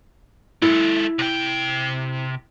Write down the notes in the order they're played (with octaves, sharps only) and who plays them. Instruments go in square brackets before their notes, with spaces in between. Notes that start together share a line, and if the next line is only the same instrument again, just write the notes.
[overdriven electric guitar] G#3 A4 [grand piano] E4
[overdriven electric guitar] C3 G5